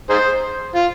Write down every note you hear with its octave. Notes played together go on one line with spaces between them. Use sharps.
D#4 G#4 C5
F4